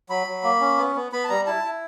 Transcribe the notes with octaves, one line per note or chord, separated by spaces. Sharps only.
F#3 B5
F#3
A#3
C#4
B3
B3
B3 B5
A5
G3 A#5
E4 A5
E4